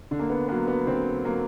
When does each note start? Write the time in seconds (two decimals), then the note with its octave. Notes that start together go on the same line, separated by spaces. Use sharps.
0.11 D3
0.19 A#3
0.30 B3
0.48 F#3 A#3 B3
0.68 B3
0.87 D3 C4
1.25 F#3 A#3